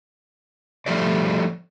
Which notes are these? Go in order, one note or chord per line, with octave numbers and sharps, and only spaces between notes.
F3 G3 A3 D5